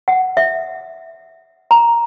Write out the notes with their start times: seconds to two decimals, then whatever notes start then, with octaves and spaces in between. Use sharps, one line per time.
0.08 F#5
0.37 E5
1.71 A#5